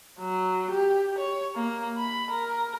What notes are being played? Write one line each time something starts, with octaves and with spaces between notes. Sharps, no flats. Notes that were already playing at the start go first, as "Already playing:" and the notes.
F#3
G4
C#5
A#3
B5
A#4